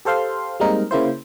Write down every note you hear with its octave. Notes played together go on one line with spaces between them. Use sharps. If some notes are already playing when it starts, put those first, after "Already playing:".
G4 A4 C5 F5 C6
G3 G#3 A#3 C4 D#4 A#4
C#3 A#3 E4 C5